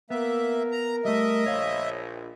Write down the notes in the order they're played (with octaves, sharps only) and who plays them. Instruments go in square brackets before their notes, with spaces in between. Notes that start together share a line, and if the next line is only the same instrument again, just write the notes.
[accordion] A#3 E5 [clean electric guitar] B3 [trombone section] A#4
[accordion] A#5
[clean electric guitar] G3 A3 [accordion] D#5 E5
[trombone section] A#1 [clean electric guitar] C#5 F5